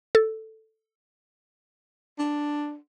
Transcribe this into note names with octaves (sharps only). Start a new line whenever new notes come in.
A4
D4